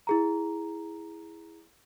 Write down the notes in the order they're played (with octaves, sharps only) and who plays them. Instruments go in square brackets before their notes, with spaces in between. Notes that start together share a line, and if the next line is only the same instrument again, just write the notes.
[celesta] E4 G#4 A#5